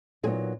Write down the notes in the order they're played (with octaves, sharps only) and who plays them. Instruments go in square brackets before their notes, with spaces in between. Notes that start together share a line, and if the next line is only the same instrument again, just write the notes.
[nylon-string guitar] A#2 F#3 B3 D#4 G#4